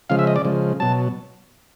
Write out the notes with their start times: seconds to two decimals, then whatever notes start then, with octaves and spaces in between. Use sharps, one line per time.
0.10 C#3 F3 G#3 F5
0.19 E5
0.27 D#5
0.36 D5
0.45 C#3 F3 G#3
0.80 B2 F#3 A5